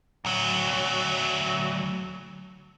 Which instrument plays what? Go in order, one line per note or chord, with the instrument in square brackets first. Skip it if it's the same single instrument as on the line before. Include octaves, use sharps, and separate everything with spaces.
[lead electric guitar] D2 F#3